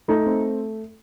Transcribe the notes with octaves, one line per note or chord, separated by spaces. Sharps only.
A3 D#4
C4